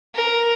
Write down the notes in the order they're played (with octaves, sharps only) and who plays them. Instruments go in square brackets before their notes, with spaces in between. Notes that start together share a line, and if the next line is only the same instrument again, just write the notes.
[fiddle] A#4